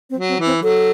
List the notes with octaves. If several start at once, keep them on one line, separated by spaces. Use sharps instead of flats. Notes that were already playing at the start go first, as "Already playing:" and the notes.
C4
F#3
C4
E3
C4
F#3 A4